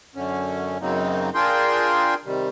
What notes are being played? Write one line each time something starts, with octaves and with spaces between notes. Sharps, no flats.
F#2 D3 C#4
F#2 C#3 F#3 A#3 C4 D#4
D4 F4 G#4 A#4 G5 C6
C3 D#3 G3